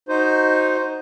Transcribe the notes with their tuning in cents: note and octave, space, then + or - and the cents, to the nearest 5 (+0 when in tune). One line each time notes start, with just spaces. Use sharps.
D#4 +0 F#4 +0 C5 +0